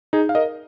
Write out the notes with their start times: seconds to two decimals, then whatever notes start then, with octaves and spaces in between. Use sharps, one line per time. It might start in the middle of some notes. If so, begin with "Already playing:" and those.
0.13 D#4 G#4
0.29 F5
0.35 A#4 D#5